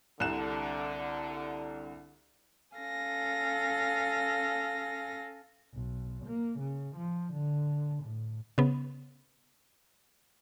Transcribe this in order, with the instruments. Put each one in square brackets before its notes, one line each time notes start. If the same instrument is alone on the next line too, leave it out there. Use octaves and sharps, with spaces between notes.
[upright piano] C2 F#6 E7 [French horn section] D3
[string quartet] C#4 A4 F5 G#5 A#6
[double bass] B1
A#3
C#3
F3
D3
A2
[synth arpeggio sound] C#3 B3